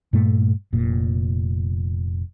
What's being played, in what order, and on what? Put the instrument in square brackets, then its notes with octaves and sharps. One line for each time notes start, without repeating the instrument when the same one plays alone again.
[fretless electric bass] G2 A#2 A3
F1 A#2